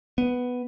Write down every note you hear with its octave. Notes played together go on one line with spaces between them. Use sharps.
B3